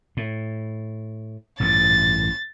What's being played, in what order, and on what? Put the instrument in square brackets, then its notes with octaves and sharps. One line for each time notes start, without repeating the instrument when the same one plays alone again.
[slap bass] A2
[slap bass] A1 G2 A#2 [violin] A6